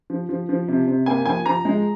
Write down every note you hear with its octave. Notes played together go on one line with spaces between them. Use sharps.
F3
F3
F3
C3
C3
A#3 G#5
F3 G#5
F3 A#5
G#3